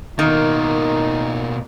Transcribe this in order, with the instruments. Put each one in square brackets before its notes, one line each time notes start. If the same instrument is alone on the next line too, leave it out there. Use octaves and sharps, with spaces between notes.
[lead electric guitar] B2 A#3 [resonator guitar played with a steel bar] D#3 [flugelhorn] D#4